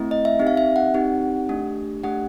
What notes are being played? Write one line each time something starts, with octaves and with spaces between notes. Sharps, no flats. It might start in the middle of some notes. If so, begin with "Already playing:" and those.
Already playing: A3 C4 E4
D#5
E5
C4 D#4 G4
F5
E5
F#5
C4 D#4 G4
A3 D4 G4
A3 D4 G4 F#5